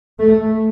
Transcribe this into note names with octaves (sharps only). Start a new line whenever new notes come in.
A3